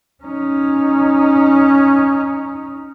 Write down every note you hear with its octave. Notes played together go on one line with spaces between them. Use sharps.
C#4 D#4